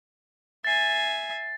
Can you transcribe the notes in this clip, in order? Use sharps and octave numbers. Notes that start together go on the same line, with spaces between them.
E5 G#5 A6 C7